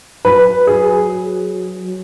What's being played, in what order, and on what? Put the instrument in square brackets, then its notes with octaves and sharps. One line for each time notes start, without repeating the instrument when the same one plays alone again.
[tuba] F#3 [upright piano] B4
[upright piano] G#4